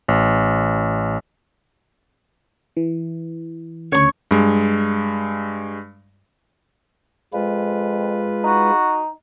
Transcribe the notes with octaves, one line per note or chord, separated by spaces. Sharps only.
A1
E3
D2 C#3 C#5 C#6
G2 G#3
F2 G#3 F4 B4
D#4 F#4